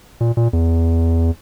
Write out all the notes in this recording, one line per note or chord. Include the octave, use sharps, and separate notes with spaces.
A#2
A#2
E2